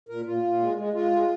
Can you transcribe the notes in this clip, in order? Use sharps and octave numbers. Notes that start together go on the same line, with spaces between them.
A#2 A#4
A#2 F4
A#2
G#3
G#3
G#3 F4
G#3